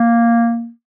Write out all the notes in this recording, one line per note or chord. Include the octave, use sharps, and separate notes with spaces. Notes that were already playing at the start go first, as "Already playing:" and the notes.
Already playing: A#3